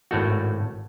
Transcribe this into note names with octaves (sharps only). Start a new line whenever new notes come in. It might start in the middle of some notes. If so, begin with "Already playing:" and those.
G#1 A2 A3 F#4